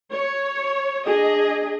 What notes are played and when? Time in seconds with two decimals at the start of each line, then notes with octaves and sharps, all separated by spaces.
0.10 C#5
1.06 D4 G#4 D#5